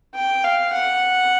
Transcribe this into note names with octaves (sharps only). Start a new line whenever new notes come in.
G5
F5
F#5